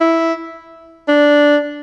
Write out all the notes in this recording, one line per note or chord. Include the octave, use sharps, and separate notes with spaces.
E4
D4